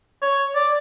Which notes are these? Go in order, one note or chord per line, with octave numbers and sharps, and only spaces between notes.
C#5
D5